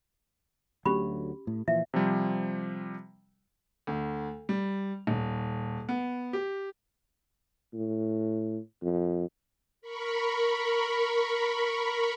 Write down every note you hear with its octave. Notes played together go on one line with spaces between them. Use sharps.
D2 F#3 A3 C#4 G4 B5
A2
A#2 E3 F3 E5
C3 F3 G3
D2
G3
D#1
B3
G4
A2
F2
A#4 B5 C#6